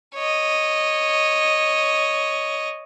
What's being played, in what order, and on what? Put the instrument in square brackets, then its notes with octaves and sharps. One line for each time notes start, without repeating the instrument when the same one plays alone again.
[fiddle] C#5 D#5